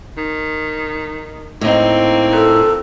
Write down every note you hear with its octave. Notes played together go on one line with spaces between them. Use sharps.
D#3
A2 A#3 C4 D#4
A#2 A4